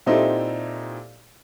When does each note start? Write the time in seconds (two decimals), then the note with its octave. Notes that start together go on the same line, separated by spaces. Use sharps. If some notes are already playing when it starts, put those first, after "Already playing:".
0.06 A#2 C4 D#4 E4 G4 A4